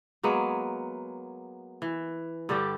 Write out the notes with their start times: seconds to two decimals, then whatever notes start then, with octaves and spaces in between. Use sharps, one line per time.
0.23 F#3 G#3 A#3 B3
1.82 E3
2.49 G2 D3 G3 G4